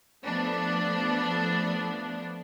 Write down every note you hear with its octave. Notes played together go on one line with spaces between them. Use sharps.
F3 A3 B3 D4